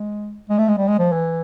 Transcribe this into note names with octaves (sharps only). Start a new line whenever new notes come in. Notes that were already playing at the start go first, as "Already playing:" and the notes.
Already playing: G#3
G#3
A3
G#3
G3
G#3
F3
E3